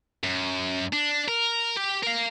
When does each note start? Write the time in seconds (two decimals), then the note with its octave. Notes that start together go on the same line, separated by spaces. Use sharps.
0.23 F#2
0.93 D4
1.28 A#4
1.77 G4
2.03 A#4 F5